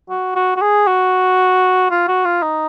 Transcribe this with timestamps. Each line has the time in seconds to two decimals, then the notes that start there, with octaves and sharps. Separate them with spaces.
0.10 F#4
0.36 F#4
0.56 F#4
0.62 G#4
0.87 F#4
1.91 F4
2.08 F#4
2.25 F4
2.43 D#4